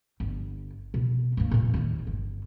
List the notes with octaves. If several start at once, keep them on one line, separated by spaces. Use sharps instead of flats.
G1
B2
G2 A#3
E2 A#2
D#2 D#3
G1